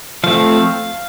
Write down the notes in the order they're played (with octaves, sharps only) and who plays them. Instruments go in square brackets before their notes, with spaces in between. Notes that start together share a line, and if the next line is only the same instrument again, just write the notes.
[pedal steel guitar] F3 A3 C4 F5